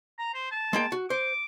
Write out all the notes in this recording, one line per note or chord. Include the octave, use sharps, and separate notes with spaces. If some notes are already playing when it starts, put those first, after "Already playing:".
A#5
C5
A5
G#3 A#3 G5
F#4
C5 D6